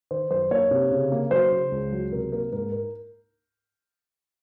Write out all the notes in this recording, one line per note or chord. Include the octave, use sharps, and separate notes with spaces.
D#3 C5
F#2 C5
A#3 C#5
C3
C#3
A#3
F#3 C5
C#3
C#2
F#3
C3 A#4
A#3 A#4
G#2 A#4
A#4